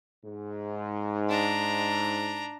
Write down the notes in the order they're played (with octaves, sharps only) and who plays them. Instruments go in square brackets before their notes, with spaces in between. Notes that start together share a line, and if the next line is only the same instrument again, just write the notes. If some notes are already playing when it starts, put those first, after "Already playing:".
[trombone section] G#2
[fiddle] D4 A#5